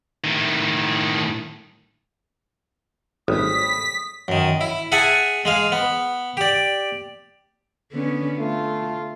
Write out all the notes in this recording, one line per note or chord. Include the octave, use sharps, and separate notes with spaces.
A2 D#3
G#1 G3 A3 C#4 D#6 B6
F#2 D#3
E4
G#4 E5 F#5 G#5 A5
G#3 G#4 F5
B3
G4 D5
D3 B3 C#4
A3 F4